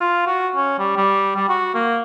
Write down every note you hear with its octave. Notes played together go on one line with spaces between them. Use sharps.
F4
F#4
C#4
G3
G3
G3
F#4
A#3